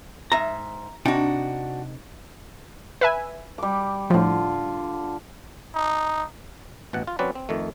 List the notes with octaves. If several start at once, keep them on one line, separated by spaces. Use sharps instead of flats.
G#2 E5 A#5
C3 D4 D#4 F#4 G5
B4 E5 G#5
G3 D6
A2 D3 F3 F4
D#4
A1 B2 F#5
F4
F#3 C4 C#4 B4 D5
C4
F2 D#3 A3